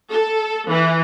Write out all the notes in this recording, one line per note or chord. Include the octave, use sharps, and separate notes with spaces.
A4
E3